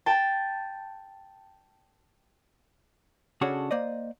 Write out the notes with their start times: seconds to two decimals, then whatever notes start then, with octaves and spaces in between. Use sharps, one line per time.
0.06 G5 A5
3.41 C#3 C#4 D4 F#4 G#4 A4
3.71 A#3 C5 D5 D#5